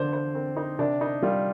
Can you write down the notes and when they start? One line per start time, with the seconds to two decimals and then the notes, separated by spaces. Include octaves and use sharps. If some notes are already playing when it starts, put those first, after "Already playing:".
Already playing: D3 F3 C5 D5
0.13 C5
0.35 C4
0.57 D#4
0.79 C3 D4
1.01 D#4
1.22 G3 F4